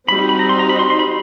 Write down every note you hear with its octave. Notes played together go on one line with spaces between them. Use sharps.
G3 C4 D#4 F#4 B5
B5
B5
A#5
C6
A#5
B5
C6
C6
B5